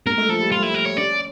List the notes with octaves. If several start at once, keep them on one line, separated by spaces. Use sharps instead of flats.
A#3 A#4
A3
F3 A4
G3
A3 F4
E4
A#4
C#5
C#4 D5